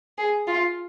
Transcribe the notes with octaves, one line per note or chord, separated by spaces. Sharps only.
G#4
F4